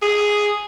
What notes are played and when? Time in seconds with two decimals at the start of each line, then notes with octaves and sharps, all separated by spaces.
0.02 G#4